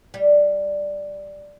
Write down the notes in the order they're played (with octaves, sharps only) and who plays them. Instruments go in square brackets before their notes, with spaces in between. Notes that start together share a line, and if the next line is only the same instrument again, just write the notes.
[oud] G3